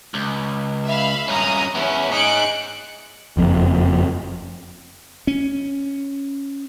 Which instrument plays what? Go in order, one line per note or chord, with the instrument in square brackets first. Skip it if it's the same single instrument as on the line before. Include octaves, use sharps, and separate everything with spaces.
[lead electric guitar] C#2
[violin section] E5 F5 B5
[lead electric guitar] G2 C#4 [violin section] A#5 D#6
[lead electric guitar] B3 E4 [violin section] C#4
[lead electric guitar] D#4 G#4 [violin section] F#6 C#7 D7
[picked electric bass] F#1 F2
[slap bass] C#4